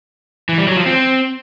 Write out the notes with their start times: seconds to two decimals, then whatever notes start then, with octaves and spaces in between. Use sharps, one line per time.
0.49 E3
0.58 G3
0.67 F#3
0.77 F3
0.86 C4